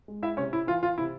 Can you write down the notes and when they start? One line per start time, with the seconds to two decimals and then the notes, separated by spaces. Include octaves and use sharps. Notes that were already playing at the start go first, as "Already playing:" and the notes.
0.08 G#3
0.23 E4 E5
0.37 C3 C#4 C#5
0.53 E4
0.67 E3 F4
0.83 F4
0.98 C3 E4